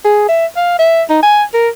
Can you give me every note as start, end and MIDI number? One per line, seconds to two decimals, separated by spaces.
0.04 0.24 68
0.29 0.45 76
0.56 0.75 77
0.79 1.03 76
1.10 1.18 63
1.23 1.43 80
1.54 1.69 70